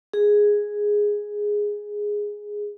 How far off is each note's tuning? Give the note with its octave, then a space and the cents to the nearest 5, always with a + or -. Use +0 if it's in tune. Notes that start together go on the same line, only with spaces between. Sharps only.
G#4 +0